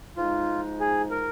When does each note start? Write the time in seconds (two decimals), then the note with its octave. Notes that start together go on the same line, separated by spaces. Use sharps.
0.16 G#2 F3 G#3 D#4 F4
0.80 G#4
1.11 A#4